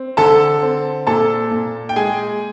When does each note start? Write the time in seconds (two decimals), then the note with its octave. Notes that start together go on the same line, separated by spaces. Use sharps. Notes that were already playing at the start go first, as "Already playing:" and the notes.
Already playing: C4
0.17 D3 A4 A5
0.62 C4
1.07 A#2 A4 A5
1.51 A#2
1.89 G5
1.96 G#3 G#4 G#5